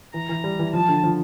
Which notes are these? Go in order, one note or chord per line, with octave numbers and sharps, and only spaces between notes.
E3 A#5
E3
G3
E3
F3 A5
D3
F3